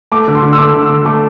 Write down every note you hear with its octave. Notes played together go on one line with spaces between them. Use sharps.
A3 D6
D3
C6
D3
E6
A3 D6
D3
E6
D3
A3 D6